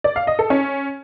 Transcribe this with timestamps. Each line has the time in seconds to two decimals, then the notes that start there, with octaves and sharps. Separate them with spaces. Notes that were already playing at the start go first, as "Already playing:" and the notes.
0.04 D5
0.16 F5
0.27 D#5
0.39 A4
0.50 C#4